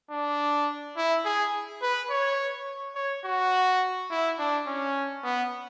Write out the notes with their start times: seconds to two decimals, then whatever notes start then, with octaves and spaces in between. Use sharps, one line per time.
0.11 D4
0.97 E4
1.25 G#4
1.82 B4
2.10 C#5
2.96 C#5
3.25 F#4
4.11 E4
4.39 D4
4.67 C#4
5.24 B3